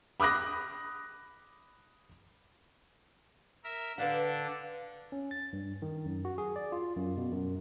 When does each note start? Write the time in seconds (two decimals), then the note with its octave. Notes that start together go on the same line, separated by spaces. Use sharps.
0.20 B5 D6 D#6 F#6 A#6
3.64 A#4 E5
3.98 D3 D4 B4 F5 F#5
5.12 C#4
5.31 A6
5.53 G2
5.82 D#3
6.06 F#2
6.25 F#4
6.38 G#4
6.56 D5
6.72 F4
6.97 F#2
7.17 B2
7.32 F#2